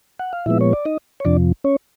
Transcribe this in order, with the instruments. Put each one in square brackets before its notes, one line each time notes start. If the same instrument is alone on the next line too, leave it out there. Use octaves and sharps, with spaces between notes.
[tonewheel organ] F#5
F5
A#2 F3 G#3 B3 E4 E5
C#5
D5
D#4 D#5
C#5
F2 C3 F3 D4 D5
C#4 C#5